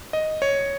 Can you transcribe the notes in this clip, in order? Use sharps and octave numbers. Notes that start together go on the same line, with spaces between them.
D#5
C#5